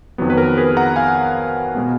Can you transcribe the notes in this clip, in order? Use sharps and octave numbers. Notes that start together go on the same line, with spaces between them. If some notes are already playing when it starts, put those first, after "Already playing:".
F2 D#3 F#3 B3
B4
A#4
G#4 B4
F#5 A#5
F5 G#5
B2 G#3 B3